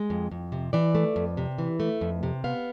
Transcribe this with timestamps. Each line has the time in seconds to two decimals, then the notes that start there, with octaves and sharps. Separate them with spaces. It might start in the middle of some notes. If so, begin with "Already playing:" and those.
Already playing: G#3
0.10 F2
0.31 F2
0.52 C3
0.73 E3 D5
0.95 A3
1.16 F2
1.37 C3
1.58 E3
1.80 A3
2.01 F2
2.23 C3
2.44 B3 F5